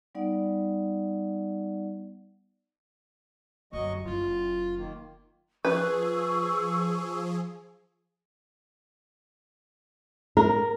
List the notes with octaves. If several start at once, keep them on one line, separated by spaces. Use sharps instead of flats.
G3 B3 D#4 D5 F#5
G1 F#2 F#3 D#5 C#6
F#1 E4 F4
D#3 A#3
F3 G#4 B4 C#6 E6
A#4